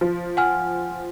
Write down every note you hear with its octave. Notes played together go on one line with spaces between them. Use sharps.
F3
F#5 G#5 F6